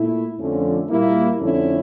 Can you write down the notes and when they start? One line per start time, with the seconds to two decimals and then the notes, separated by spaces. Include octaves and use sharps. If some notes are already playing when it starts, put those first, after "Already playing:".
Already playing: A#2 A3 E4
0.38 F2 D3 F3 A3 C#4
0.89 A#2 G3 A#3 E4
1.40 F2 D3 A3 C#4 E4